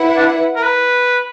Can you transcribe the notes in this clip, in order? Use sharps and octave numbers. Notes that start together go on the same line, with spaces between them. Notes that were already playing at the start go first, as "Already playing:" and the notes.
Already playing: E4 B4 F#5
D4
A#4
B4